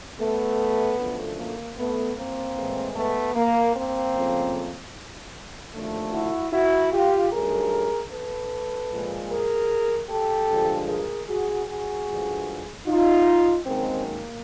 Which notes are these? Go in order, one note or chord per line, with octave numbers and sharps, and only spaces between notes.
A3 B3
F#2 D3 F3 A3
A#3
A3 B3
A#3 C4
A2 E3 G#3
A3 B3
A#3
A#3 C4
F2 C#3 F3 A3
D#2 D3 F3 A3
E4 F#4
E4 F#4
F4 G4
G2 D#3 F#3 A3 G#4 A#4
A4 B4
A#2 F3 G#3
G#4 A#4
G4 A4
G2 D3 F3 G#3
G#4 A#4
F#4 G#4
F#4 G#4
G2 D3 F3 G#3
D#4 F4
F#2 D#3 G#3 A#3 C4
A#3